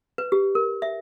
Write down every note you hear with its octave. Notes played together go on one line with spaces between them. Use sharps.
B4
G4
A#4
E5